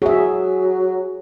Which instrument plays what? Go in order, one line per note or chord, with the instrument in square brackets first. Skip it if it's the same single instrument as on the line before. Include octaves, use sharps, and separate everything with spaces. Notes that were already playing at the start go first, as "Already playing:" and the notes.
[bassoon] F#3 [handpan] G#4 E5